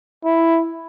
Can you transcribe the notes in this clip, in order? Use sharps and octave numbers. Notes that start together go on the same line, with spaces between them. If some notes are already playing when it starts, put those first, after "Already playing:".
E4